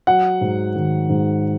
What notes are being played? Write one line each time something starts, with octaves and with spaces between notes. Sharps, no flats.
F#3 F#5
G#2
D#3
G#2